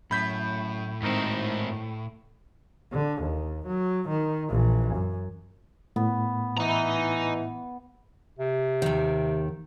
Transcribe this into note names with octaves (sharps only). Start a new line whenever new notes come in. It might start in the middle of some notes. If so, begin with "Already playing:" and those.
F#2 A2 B5 G6 B6
G#2 D#3 C4 D#4 E4
D3
D#2
F#3
D#3
A#1 E3
F#2
A2 B3
E3 D#5 A#5
C3
D#2 D#3